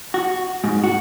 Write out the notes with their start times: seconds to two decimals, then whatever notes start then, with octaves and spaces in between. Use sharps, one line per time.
0.14 F#4
0.64 G#2
0.84 F#4